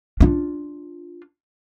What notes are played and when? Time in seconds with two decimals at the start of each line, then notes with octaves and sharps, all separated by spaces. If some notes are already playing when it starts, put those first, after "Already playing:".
0.21 D4 F4